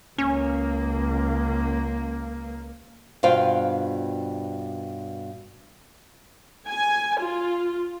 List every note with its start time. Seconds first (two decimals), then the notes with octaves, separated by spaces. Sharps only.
0.18 C#2 A#3 C#4
3.23 G2 B2 F4 C5 F5 G5
6.69 G#5
7.20 F4